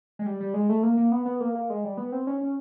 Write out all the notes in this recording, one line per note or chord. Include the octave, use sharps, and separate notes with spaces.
G#3
G3
G3
G#3
A3
A#3
A#3
B3
B3
A#3
A#3
G#3
G3
B3
C4
C#4
C#4